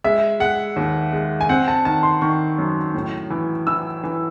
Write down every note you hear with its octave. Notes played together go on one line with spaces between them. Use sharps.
G#3 E5
G#3 F#5
D#2
G#3
G#5
C4 F#5
A5
D#3 A5
C6
D#3 C#6
F#2
A2
E3
E3 E6
E3